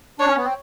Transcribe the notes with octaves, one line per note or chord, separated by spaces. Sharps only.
D4 C#5
C#4
B3
C4